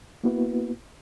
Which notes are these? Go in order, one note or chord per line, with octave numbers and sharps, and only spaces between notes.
A#3 B3 E4 F#4 B4